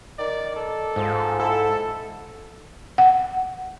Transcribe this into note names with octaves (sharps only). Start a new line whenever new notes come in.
D#3 D5
A4
G#2 F3
E4 A4
F#5